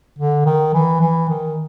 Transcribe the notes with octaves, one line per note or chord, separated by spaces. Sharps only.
D3
D#3
E3
E3
D#3